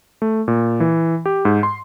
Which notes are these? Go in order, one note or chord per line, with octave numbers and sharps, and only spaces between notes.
A3
A#2
E3
G4
G#2
C6